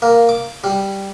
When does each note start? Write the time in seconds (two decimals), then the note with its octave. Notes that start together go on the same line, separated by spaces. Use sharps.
0.02 A#3
0.29 D6
0.64 G3